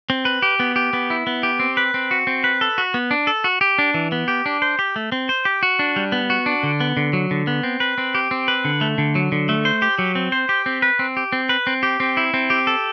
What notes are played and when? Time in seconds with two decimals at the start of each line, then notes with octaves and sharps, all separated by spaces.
0.10 C4
0.25 B4
0.42 G4
0.60 B3
0.76 G4
0.93 B3
1.10 E4
1.27 B3
1.43 G4
1.59 C4
1.77 B4
1.94 C4
2.11 F#4
2.27 C4
2.44 B4
2.61 A4
2.78 F#4
2.94 B3
3.11 D4
3.27 A4
3.44 F#4
3.61 G4
3.79 D4
3.94 E3
4.12 B3
4.28 G4
4.46 D4
4.62 C5
4.79 G4
4.96 A3
5.12 C4
5.29 C5
5.45 G4
5.63 F#4
5.79 D4
5.96 G3
6.12 B3
6.30 F#4
6.46 D4
6.63 D3
6.80 B3
6.97 D3
7.13 F#3
7.31 D3
7.47 B3
7.63 C4
7.80 B4
7.98 C4
8.15 G4
8.31 C4
8.48 B4
8.65 D3
8.81 A3
8.98 D3
9.15 F#3
9.32 D3
9.49 A3
9.65 C5
9.82 G4
9.99 F#3
10.15 C4
10.32 C5
10.49 G4
10.66 C4
10.82 B4
10.99 C4
11.17 G4
11.32 C4
11.49 B4
11.67 C4
11.83 G4
12.00 C4
12.17 E4
12.34 C4
12.50 G4
12.67 A4